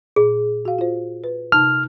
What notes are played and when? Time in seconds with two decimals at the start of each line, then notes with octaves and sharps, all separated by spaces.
0.16 A#2 G#4
0.65 F#4 F5
0.79 F4 C5
1.24 B4
1.52 C3 D#4 A5 F6